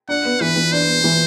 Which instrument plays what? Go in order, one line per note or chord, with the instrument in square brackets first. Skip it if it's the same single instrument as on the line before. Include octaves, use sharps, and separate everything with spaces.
[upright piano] D4 [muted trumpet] F#5
[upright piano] B3
[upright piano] E3 [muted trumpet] B4
[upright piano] E3
[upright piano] D4 [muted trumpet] C5
[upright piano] B3
E3